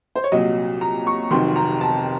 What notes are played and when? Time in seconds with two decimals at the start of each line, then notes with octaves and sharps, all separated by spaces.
0.16 C5
0.24 C#5
0.32 C2 A#2 F#3 D#5
0.81 A#5
1.07 C#6
1.31 F1 F2 D#3 F#3 C6
1.56 A#5
1.81 A5